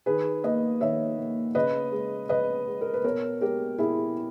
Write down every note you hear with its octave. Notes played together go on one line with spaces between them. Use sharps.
D#3 G#4 B4
A#3 B4 D#5
D#3 C#5 E5
A#3
C#3 B4 D#5
G#3
C#3 B4 D#5
G#3
A#4
B4
B2 A#4 C#5
G#3 G4 A#4
B2 E4 G#4